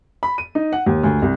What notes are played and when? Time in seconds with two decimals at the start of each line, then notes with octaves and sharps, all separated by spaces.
0.23 B5
0.38 D#7
0.55 D#4
0.73 F#5
0.86 D#2
1.04 D2
1.22 C2